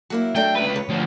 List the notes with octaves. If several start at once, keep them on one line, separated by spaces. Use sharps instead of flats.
F#3 A#3 E4
F#3 A3 D4 G5
C#2 B4
C#5
D2 F3